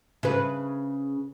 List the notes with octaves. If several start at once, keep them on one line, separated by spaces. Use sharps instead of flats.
C#3 B4